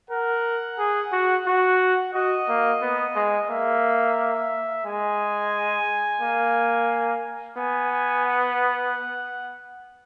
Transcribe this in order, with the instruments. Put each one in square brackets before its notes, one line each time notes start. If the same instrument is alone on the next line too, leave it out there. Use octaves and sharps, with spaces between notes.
[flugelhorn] A#4 [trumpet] F#5
[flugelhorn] G#4
F#4
F#4
[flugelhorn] F#4 [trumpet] D#5
[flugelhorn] A#3
B3
G#3
[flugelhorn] A#3 [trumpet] E5
[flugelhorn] G#3 [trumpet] G#5
[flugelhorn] A#3
[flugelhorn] B3 [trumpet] G#5
[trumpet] G#5
F#5